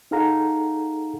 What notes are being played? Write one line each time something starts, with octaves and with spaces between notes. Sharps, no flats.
D#4 G#4 A4 F5 F#5 A#5